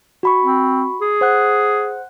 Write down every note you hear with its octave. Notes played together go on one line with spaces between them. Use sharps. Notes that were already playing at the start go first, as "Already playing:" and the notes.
F#4 B5 C#6
C4
G#4
C5 F#5 F#6